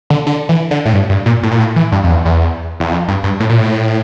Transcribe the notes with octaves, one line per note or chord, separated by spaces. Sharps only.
D3
D3
E3
D3
A2
G2
G2
A#2
A2
A#2
A2
E3
G2
F2
E2
E2
E2
F2
G2
G2
A2
A#2
A2